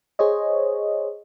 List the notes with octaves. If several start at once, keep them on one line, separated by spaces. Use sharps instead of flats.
G#4 C5 C#5 D#5